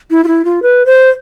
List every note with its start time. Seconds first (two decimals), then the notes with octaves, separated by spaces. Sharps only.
0.11 E4
0.24 F4
0.28 E4
0.45 F4
0.62 B4
0.86 C5